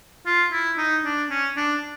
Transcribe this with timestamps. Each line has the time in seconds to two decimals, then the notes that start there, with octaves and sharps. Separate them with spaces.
0.26 F4
0.53 E4
0.78 D#4
1.05 D4
1.30 C#4
1.57 D4